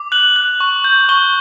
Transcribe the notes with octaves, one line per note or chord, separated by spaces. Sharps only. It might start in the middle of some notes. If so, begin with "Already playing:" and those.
Already playing: D6
F#6 F#7
F#6
C#6
G6
C#6 G7